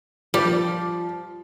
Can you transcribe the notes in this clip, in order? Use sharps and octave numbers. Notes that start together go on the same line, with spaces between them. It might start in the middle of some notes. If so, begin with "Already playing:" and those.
F3 G3